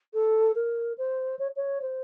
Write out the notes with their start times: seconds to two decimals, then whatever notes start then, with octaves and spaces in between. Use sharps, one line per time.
0.13 A4
0.55 A#4
0.97 C5
1.39 C#5
1.56 C#5
1.81 C5